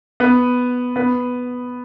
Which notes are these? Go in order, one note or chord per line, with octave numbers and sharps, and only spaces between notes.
B3 B4
B3 B4